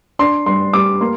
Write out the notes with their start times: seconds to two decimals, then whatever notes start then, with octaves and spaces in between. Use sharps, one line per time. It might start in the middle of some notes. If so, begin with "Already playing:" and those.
0.19 D4 C6
0.46 G2 C6
0.73 G3 D6
1.01 A#3 C6